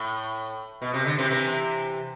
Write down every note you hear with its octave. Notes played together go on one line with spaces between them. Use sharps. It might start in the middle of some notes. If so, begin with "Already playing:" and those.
Already playing: A2
B2
C3
D3
C3 E3
C3 E3